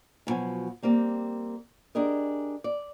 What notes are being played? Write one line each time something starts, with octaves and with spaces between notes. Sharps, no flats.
E2 B2 F3 F#3 G#5
G3 A#3 C4 G4
D4 G4 G#4 A#4 D#5
D5